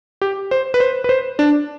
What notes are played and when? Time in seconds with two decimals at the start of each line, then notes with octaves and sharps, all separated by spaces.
0.22 G4
0.51 C5
0.74 B4
0.80 C5
1.04 B4
1.09 C5
1.39 D4